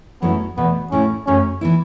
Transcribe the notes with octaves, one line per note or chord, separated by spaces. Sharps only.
F#2 F#3 A3 B3 C#4 E4
E2 B2 A3 B3
A2 A3 C#4 E4
F#2 F#3 A3 C#4
E3 B3 E4